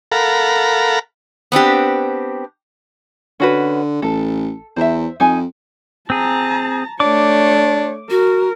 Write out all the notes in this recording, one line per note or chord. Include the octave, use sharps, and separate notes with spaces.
A4 A#4 F5 F#5 A#5 B5
B3 C4 D4 G4
D3 C#4 F#4 B4
A1 A4
E2 C5 E5
F2 D#4 G#5
C4 G#4 A5 A#5
A3 D4 C#5 D6
F#4 A#4